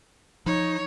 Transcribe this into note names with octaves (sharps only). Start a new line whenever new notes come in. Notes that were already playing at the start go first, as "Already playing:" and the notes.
F3 D#4 C#5